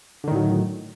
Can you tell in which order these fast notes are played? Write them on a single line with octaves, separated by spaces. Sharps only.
D3 D#3 A2 F#3